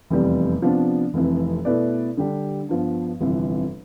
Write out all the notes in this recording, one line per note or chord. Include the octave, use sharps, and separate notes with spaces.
F1 E2 C3 G3
C3 F3 B3 D4
F1 F2 E3
B2 A3 E4 B4 D5
D3 G3 D4 G4
G2 F3 B3
G1 F2 C3 E3